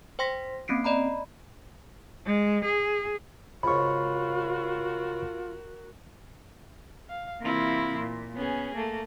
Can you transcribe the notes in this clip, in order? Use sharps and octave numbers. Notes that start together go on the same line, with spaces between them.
C5 G5 C6 A#6 B6
A#3 C4 C#4 C7 D7
D5 D#5 A#5 B5
G#3
G#4
G#2 C#3 F4 F#4 A#4 B5 C#6
F5
C3 E3 A#3 C4 E4 F4
A#2
B3 C#4 G#4
A3 A#3